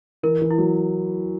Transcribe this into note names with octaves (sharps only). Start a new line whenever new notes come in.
E3 A#4
E3
E4
F#3